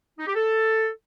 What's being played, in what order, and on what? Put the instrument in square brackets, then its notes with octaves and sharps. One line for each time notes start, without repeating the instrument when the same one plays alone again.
[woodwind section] D#4
G4
A4